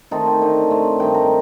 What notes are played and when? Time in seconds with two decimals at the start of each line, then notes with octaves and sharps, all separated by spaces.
0.11 D#3 A3 C4 D#4 A5
0.27 G5
0.41 D3 A3 D#4
0.70 A2 A3 C4
1.00 G2 D#3 A3 D#4 G5
1.14 A#5